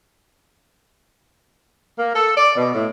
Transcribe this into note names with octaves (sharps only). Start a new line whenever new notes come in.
A#3
A4
D5
B2
A2